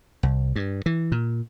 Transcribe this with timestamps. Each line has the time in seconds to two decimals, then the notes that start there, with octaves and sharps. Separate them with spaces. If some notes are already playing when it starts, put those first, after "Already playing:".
0.23 C2
0.56 G2
0.86 E3
1.12 A#2